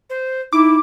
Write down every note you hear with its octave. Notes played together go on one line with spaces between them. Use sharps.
C5
D#4 E4 D6